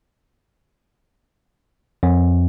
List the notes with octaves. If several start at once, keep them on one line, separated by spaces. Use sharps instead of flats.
F2